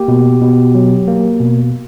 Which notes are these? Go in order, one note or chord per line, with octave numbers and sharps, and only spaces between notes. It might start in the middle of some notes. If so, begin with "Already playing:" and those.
Already playing: A#3 G4
B2
B2
F#3
A#3
B2